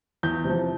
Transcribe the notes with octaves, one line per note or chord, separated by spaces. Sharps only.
E2 G6
C3
F3